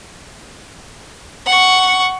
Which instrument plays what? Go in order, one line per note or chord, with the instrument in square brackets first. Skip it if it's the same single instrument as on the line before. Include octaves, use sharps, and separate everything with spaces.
[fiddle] F#5 C#6